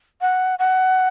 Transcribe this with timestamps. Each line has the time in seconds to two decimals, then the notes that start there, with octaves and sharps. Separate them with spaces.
0.21 F#5
0.59 F#5